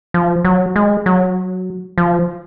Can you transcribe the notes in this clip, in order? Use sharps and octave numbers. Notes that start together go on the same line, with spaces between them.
F3
F#3
G#3
F#3
F3